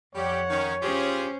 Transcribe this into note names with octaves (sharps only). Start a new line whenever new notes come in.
F2 G3 G4 C#5 F#5
D#3 C#4
C#4 F4 G4 G#4 C5